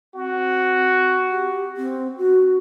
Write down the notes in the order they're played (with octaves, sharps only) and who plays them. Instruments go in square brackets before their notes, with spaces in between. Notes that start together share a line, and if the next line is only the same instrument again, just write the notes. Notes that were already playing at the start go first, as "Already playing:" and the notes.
[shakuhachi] C4 [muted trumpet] F#4
[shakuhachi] G4
C4
F#4